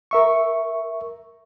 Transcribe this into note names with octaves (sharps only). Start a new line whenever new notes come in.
A#4 E5 C#6